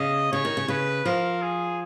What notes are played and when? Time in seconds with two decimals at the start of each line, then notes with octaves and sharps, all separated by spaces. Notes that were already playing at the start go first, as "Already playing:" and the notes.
Already playing: C#3 D#5
0.32 C#3 C#5
0.45 D#3
0.57 C#3
0.68 C#3 B4
1.05 F3 A#4
1.42 G#4